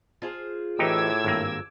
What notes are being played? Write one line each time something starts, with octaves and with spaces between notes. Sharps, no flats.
F4 G#4 C5
A2 E3 D#4 G4 D6 E6 G#6
G#1 G2 A#3